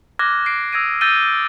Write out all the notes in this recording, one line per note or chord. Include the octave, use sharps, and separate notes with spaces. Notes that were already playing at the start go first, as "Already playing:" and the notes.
D6 F6 F#6 G#6 A#6
C7 D7
D#6 E6 G#6 A#6 D7 D#7
E6 G6 A6 A#6 D#7 G7
D7